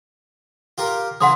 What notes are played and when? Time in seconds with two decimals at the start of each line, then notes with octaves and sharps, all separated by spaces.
0.78 F4 G4 A#4
1.21 C#3 E3 F#3 F#5 C6 D#6